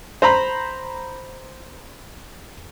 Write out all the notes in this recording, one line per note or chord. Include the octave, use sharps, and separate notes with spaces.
C5 A#5 B5